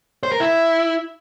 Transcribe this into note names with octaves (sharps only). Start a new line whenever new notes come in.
C5
A#4
E4